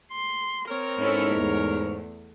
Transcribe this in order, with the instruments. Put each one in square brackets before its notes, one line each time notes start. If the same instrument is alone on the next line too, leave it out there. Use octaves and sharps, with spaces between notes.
[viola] C6
[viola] C4 [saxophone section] A#4 C#5
[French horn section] G#2 [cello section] C#4 E4 A4
[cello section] E2 [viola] A3